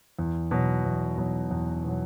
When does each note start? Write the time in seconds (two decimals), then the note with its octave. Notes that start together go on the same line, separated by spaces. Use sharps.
0.19 E2
0.51 B2 F#3
0.85 E2
1.18 B2 F#3
1.51 E2
1.85 B2 F#3